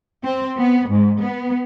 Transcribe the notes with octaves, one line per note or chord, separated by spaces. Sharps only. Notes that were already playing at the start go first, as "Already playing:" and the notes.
C4
B3
G#2
B3